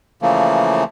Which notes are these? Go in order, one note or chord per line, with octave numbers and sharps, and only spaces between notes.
C#3 E3 F3 A3 A#3